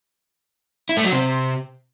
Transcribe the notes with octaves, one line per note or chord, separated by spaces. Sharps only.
E4
A3
F#3
C3